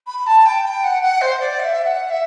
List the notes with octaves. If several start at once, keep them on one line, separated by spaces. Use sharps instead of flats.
B5
A5
G5
G5
F#5
F#5
C5
D5
F#5
E5
F#5
E5